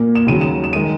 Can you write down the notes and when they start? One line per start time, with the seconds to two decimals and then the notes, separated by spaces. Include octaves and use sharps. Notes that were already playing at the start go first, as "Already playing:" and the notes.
Already playing: A#2 A#3
0.15 E7
0.26 D#2 C#3 F#3 D#7
0.41 E7
0.64 E7
0.73 D#3 G#3 D#7